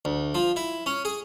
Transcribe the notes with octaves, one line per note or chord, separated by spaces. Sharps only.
D2
F3
E4
C#4
G#4